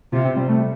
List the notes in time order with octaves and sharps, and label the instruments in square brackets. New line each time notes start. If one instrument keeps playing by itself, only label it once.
[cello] C3 [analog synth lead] F4
[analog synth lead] C4
G3
A3